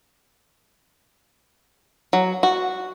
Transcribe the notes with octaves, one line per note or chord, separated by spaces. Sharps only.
F#3
F#4